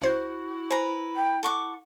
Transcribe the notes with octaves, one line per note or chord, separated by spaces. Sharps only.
C#2 E4 F#4 C5 G6
B4 C5 G#5 A#5
G5
A4 F#5 C#6 D6